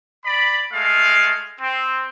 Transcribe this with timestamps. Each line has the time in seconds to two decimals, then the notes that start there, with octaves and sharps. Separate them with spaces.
0.25 D5 B5
0.72 G#3 A3 F5
1.60 C4